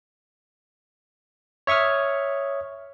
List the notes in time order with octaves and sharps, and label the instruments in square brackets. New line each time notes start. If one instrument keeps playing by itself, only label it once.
[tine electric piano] C#5 E5 C#6 D#6 F6